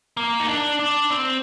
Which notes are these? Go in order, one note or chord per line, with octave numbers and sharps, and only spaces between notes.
A#3
D#4
D4
D4
C4